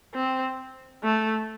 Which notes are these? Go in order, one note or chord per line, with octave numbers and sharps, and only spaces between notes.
C4
A3